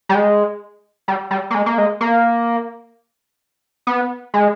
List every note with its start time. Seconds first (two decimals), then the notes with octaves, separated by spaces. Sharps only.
0.09 G3
0.15 G#3
1.08 G3
1.31 G3
1.50 A#3
1.55 G#3
1.66 A#3
1.78 G#3
2.01 A#3
3.87 B3
4.34 G#3